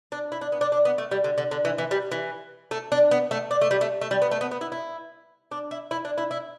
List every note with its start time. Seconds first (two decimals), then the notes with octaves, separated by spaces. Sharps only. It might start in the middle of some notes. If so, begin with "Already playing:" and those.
0.12 D4
0.32 E4
0.41 D4
0.52 B3
0.61 D4
0.72 D4
0.85 B3
0.98 A3
1.11 G3
1.24 D3
1.38 D3
1.51 D3
1.65 E3
1.78 E3
1.91 G3
2.12 E3
2.71 A3
2.92 D4
3.11 B3
3.31 A3
3.51 D4
3.61 A3
3.71 G3
3.81 A3
4.01 A3
4.11 G3
4.22 B3
4.31 A3
4.41 B3
4.51 B3
4.61 E4
4.72 E4
5.52 D4
5.71 E4
5.91 E4
6.05 D4
6.18 E4
6.31 E4